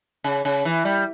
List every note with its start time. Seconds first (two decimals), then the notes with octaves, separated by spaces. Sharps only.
0.24 C#3
0.45 C#3
0.65 E3
0.85 G3